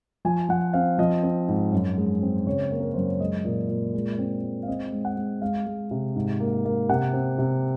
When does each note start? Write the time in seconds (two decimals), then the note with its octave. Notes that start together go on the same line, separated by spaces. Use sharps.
0.25 F3 G#5
0.49 F3 F#5
0.73 C4 F5
0.98 F3 D#5
1.23 C4
1.48 G#2
1.72 F#2
1.98 G#3
2.22 C4
2.47 C#3 C#5
2.71 A#3
2.80 A#4
2.94 F#2 C5
3.07 C#5
3.20 G#3 D#5
3.45 A#2
3.69 A#2
3.94 G#3
4.19 C4
4.44 G#3
4.63 F5
4.68 C4 D#5
4.92 G#3
5.05 F#5
5.17 G#3
5.42 G#3 F5
5.66 G#3
5.91 C3
6.16 G#2
6.40 A#3
6.65 A#3
6.89 C3 F#5
7.13 C4
7.38 C3